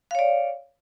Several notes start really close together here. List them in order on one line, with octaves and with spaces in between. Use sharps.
F5 C#5 D5